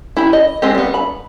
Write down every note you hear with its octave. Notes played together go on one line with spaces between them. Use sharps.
E4 G4 B5
D#5
G#3 C4 G4
G3 B3
B5